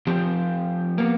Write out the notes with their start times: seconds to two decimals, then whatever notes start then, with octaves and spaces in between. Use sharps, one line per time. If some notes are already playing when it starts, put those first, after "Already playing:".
0.07 F3 C4 G4
0.98 A#3 B3